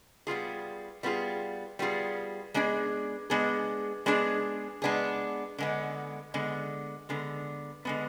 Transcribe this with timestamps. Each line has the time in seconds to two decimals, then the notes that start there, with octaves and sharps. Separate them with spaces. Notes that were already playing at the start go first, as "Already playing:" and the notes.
0.27 G3 B3 F4 G#4
1.03 G3 B3 F4 G#4
1.79 G3 B3 F4 G#4
2.54 G#3 B3 D4 G#4
3.30 G#3 B3 D4 G#4
4.06 G#3 B3 D4 G#4
4.82 G#3 B3 D4 G#4
5.58 D3 G#3 B3
6.34 D3 G#3 B3
7.09 D3 G#3 B3
7.85 D3 G#3 B3